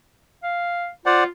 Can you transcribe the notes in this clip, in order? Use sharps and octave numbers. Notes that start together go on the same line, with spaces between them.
F5
F4 C5 D5 F#5